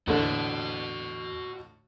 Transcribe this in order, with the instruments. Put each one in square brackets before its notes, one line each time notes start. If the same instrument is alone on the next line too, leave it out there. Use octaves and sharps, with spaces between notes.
[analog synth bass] E2 [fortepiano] A2 D3 A3 [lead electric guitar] F#4 D#5